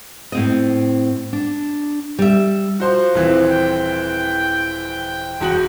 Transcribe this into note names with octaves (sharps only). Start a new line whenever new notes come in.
A2 C4 D#5
D4
G3 E5
F3 F#4 C5 C6
D#1 E3 C4
G5
E1 F#4 F#7